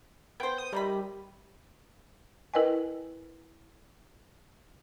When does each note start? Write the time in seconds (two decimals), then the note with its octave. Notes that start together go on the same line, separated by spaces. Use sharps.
0.40 B3 C5 G5
0.58 D#6
0.73 C3 D#3 G3 B5
2.54 E4 A#4 B4 D#5 G5 G#5